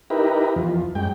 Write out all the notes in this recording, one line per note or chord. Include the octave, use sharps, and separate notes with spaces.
D#4 E4 G4 A#4 B4
E2 F3
F#2 G#3 G5